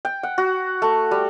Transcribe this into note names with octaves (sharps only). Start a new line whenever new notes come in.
G5
F#5
F#4
A3
G3